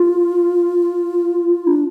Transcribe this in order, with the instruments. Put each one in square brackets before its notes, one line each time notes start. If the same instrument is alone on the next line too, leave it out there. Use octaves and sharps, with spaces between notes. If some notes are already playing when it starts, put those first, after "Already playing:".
Already playing: [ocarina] F4
D4